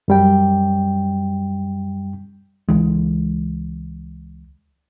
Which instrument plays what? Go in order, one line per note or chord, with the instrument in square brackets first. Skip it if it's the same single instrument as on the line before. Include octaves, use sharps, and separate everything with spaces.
[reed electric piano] F#2 G3 G5
[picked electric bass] C#2 E3 G#3